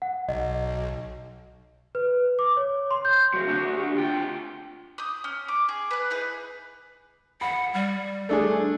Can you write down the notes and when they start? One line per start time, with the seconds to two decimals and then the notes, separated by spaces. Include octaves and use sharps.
0.02 F#5
0.29 B1 D#5
1.95 B4
2.39 D6
2.57 C#5
2.91 C6
3.05 G6
3.34 C#3 F#3 F#4
3.47 D2 D4
3.76 G4
3.95 D2 F4 G5
4.98 D#6 G6
5.24 C#4
5.48 D6
5.69 G#4
5.91 B4 B5 F#6
6.10 D#4 E4 G#4 B4
7.41 F#5 B5
7.74 G3
8.29 A3 D4 G#4